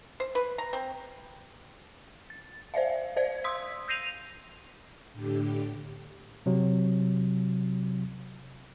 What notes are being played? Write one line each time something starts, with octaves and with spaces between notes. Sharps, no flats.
C5
B4
A#5
C4
A6
C5 D5 E5 F5
C5 D5 F5 G#6
C6 D#6 E6 B6
E6 G6 A#6 C7 D#7 F7
A2 D3 G4
C3 F#3